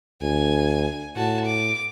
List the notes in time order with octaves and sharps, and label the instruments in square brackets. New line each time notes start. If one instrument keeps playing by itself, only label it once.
[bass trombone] D2 [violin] G#5
[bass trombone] A2 [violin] F#4 A5
[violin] D6